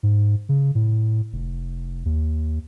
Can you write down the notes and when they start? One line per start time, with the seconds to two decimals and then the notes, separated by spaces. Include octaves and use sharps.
0.03 G#2
0.49 C#3
0.75 A2
1.33 F1
2.05 D#2